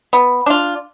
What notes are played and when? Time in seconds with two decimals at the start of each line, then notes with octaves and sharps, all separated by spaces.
0.13 B3
0.46 D4 F4